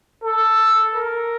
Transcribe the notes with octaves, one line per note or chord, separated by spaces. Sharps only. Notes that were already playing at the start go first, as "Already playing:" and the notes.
A4
A#4